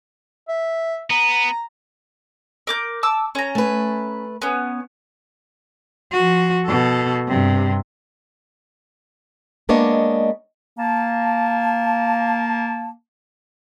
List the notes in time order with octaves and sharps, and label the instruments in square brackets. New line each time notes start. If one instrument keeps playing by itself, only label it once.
[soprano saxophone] E5
[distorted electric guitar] B3 [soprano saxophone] A#5
[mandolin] A#4 D6 G6
A5 D6 E6
C#4 A#5
[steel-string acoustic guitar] A3 B4
[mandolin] B3 C#4
[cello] F3 F#4
B2 A4
G2 C3
[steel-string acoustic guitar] G#3 A#3 B3 D4 C#5 D#5
[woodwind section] A#3 A5